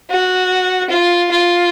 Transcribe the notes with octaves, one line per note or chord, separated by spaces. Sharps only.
F#4
F4
F4